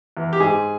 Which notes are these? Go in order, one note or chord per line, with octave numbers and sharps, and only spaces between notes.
E2
G4
G#2 G#4